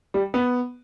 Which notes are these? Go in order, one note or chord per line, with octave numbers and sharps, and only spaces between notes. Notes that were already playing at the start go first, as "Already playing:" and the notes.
G3
B3